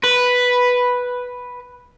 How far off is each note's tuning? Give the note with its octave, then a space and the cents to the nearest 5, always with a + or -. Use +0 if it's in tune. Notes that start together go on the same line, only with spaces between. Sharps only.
B4 +0